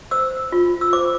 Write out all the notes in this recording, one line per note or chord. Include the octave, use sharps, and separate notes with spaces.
C5 E6
F4
E6
C5 D6